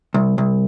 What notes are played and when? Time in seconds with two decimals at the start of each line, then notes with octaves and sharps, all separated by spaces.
0.14 C2
0.38 C2